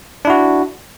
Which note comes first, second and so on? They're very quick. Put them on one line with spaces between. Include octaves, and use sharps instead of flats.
D4 E4 F#4